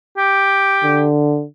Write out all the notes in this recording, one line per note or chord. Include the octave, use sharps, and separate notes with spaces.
G4
D3